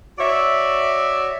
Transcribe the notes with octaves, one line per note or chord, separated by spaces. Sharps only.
F#4 C#5 D5 E5